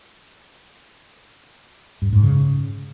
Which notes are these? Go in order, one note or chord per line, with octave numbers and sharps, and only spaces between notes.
G2
G#2
C#3